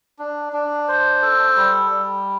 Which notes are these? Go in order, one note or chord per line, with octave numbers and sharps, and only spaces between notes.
D4
D4
C5
A4
G3
G3